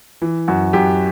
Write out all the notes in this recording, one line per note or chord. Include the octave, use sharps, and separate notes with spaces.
E3
F#2 F#4
F#2 G4